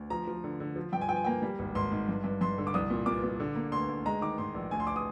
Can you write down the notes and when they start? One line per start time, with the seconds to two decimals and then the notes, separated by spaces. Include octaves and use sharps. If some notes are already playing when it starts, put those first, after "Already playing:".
Already playing: D2
0.10 F3 A#5
0.27 F3
0.44 D3
0.60 D3
0.76 F3
0.92 G2 G5
1.01 G#5
1.09 F3 G5
1.16 G#5
1.24 A#3 G5
1.42 G3
1.59 G#1
1.75 G#1 C6
1.92 G#2
2.08 G2
2.24 G2
2.41 G2 C6
2.58 D3
2.67 D6
2.74 C2 D#6
2.90 A#2
3.06 A#2 D6
3.23 A#2
3.40 D3
3.55 A#3
3.72 D2 C6
3.89 D2
4.05 G#3 A#5
4.21 D#3 D6
4.38 G#2 C6
4.54 A#1
4.71 D2 G#5
4.80 C6
4.87 D6
4.96 D#6